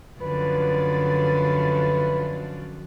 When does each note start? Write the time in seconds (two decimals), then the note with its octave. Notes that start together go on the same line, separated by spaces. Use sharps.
0.20 F#2 D3 F3 B4